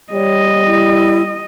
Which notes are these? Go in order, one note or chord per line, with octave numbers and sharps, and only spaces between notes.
G3 C#5 D#5
E4